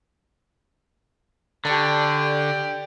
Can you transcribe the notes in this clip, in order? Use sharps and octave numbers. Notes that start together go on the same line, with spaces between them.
D3 G4 D5 A5 C#6